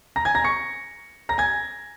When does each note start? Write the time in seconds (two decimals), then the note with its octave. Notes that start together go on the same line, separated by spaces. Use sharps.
0.16 A#5 A#6
0.25 G#5 G#6
0.35 A#5 A#6
0.44 C#6 C#7
1.29 A#5 A#6
1.38 G#5 G#6